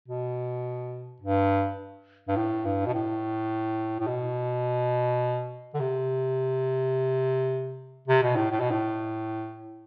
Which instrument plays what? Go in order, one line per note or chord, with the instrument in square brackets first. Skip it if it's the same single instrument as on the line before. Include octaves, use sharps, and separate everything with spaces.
[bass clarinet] B2
G2
G2
A2
G2
B2
A2
A2
B2
D3
C3
C3
B2
A2
A2
B2
A2